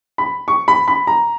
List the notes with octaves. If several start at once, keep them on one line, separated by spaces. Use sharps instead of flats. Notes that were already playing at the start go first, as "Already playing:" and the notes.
B5
C#6
B5
B5
A#5